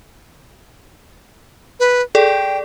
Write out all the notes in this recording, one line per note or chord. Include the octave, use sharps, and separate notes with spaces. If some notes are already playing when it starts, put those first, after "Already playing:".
B4
G#4 A4 D5 G5